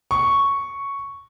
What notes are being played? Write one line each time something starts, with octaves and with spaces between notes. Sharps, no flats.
C#6